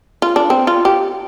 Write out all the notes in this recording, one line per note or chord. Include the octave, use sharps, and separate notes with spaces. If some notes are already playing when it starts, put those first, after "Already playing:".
F4
D4
C4
F4
G4